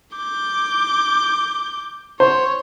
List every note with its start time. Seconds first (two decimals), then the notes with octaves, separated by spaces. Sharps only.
0.17 D6 G6
2.20 C5 C#5